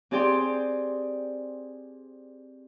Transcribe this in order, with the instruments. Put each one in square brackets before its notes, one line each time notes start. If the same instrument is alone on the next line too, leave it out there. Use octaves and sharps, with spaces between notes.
[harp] C4 G4 G#4 D5 G5 C6